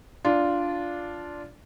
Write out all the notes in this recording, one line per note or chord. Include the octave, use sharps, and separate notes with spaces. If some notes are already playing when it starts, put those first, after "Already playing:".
D4 F4